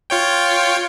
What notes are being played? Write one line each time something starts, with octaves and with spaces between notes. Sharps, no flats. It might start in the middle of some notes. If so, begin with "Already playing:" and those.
F4 C#5 G5